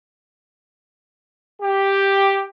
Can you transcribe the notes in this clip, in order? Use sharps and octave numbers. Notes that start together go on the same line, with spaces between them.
G4